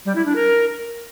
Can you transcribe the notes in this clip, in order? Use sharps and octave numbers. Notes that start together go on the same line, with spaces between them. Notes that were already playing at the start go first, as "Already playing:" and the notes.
G3
E4
D4
A#4